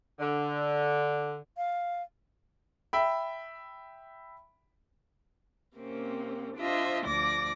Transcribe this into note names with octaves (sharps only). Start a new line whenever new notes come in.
D3
F5
E5 G5 B5
C3 A#3 C4 C#4
D4 F4 C5 D#5 E5
D2 F3 D5 D6 A#6